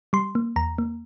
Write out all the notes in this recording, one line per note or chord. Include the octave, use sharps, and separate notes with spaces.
G3 C6
A#3
E2 A#5
A#3